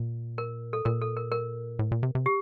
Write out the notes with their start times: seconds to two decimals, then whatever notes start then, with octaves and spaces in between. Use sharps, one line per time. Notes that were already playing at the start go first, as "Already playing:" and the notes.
Already playing: A#2
0.38 A#4
0.73 A4
0.85 A#2 A#4
1.01 A4
1.17 A#4
1.32 A#4
1.79 A2
1.92 A#2
2.03 C3
2.15 C3
2.26 G4